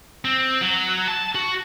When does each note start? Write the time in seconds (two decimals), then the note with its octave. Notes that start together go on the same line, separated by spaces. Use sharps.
0.25 C4
0.61 F#3
1.08 A5
1.35 F#4